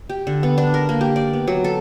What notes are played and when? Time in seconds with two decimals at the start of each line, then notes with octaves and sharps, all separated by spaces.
0.09 G4
0.27 D3
0.43 B3
0.58 D4
0.74 A#4
0.89 A#3
1.01 G4
1.16 D5
1.33 B3
1.48 F#3
1.64 A4